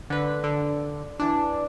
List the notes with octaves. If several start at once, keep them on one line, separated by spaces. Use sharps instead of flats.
D3 B4
D3
E3 D4